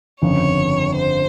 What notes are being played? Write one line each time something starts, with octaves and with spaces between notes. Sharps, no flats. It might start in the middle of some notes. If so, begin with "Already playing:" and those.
G1 F2 C#3 C#5
C5